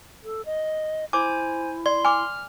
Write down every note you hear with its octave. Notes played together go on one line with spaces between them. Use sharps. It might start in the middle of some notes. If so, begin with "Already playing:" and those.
A4
D#5
E4 C5 G#5 D6
D5 C6
G#5 D6 F6